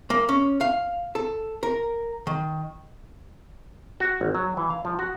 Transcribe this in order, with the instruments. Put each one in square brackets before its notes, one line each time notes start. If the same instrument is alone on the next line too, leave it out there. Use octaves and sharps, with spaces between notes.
[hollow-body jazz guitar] A#3
C#4
F5
A4
A#4
D#3
[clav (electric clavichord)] F#4
G#1
F#3
E3
F5
F3
F#4